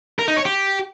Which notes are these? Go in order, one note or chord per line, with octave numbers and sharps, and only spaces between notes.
A#4
D#4
C#5
G4